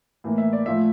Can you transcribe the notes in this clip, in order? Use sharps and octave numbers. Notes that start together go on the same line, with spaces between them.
A2 E3 A#3
E5
D5
A2 F3 A3 E5